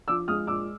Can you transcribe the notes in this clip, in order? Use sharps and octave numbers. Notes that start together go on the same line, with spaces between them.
F3 D6 E6
G#3 D#6 F6
A#2 D6 E6